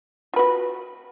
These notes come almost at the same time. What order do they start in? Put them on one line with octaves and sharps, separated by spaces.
F4 B4 F#4